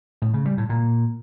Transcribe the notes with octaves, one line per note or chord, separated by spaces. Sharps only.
A2
C#3
G3
A2
A#2